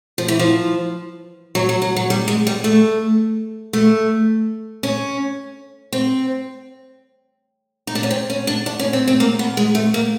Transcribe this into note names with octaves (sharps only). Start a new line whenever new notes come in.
F3
E3
F3
F#3
F#3
F#3
F#3
G3
G#3
G3
A3
A3
C#4
C4
D#4
D4
C#4
C4
C#4
D4
D4
C#4
C4
C4
A#3
B3
G#3
A3
A#3